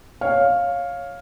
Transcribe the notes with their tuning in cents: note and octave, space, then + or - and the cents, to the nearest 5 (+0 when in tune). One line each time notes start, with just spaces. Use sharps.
C#5 +0 F5 +5